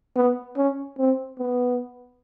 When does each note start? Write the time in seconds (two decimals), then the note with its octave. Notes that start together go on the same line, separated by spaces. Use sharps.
0.16 B3
0.57 C#4
0.98 C4
1.39 B3